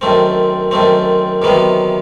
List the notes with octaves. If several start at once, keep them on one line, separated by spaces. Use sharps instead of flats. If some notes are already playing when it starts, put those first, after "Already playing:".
F#2 D#3 A3 C4
F#2 D#3 A3 C4
E2 C3 D#3 F#3 B3